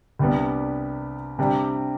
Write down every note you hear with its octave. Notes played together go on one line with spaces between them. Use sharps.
C2 C3 G3 B3 D4
C3 G3 D4